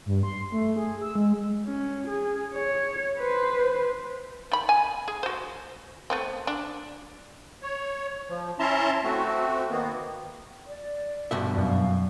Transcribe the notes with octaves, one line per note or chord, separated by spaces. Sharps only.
G2
C6
A3
G#4
E6
G#3
C#4
G#4
C#5
B4 C5
D#3 B5
G#5
G#4
F#4 C5
A3 B3 C4
D4
C#5
F3
C#4 E4 E5 A5 A#5 C6
A3 C4 F#4
D#3 A#3 B3
D5
G2 B2 E5
F#2 F5